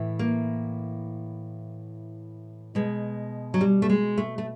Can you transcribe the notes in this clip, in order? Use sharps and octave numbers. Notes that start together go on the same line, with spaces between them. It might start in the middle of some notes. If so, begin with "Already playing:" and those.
Already playing: A2 E3
A#3
B2 G#3
F#3
G3
A3
G#3
A3
A3